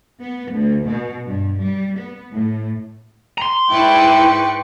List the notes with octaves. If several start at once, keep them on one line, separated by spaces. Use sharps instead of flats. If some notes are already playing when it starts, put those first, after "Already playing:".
B3
D2
B2
G2
G3
B3
A2
A#5 C6
G#2 E4 B4 D5 G5 C#6